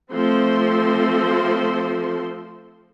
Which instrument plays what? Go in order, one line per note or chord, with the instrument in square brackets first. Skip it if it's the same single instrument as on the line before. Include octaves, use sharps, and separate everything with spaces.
[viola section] F3 A3 C4 A4 C5 C6